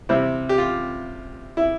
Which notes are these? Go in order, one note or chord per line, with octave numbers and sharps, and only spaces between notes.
C3 G3 C4 E4
G4
F4
E4